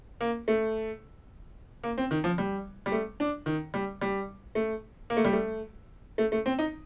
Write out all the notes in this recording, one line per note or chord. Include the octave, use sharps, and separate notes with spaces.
A#3
A3
A#3
C4
D#3
F3
G3
G3
A3
D4
D#3
G3
G3
A3
A#3
A3
G3
A3
A3
A3
C4
D#4